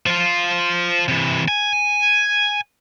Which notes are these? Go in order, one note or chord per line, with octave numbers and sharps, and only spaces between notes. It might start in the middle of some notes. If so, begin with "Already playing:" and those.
F3 F4
C3 E3
G#5